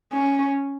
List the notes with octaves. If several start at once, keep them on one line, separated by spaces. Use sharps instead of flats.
C#4